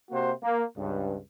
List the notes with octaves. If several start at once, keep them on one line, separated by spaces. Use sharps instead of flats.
C3 A#3 F#4 C5
A#3
C#2 G2